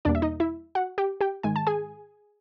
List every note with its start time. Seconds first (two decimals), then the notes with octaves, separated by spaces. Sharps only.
0.05 E2 B2 G3 A#3 D4 D5
0.15 E5
0.22 D#4 D#5
0.40 E4 E5
0.75 F#4 F#5
0.98 G4 G5
1.21 G4 G5
1.43 G#2 D#3 G#3 G#5
1.56 A5
1.67 G#4 G#5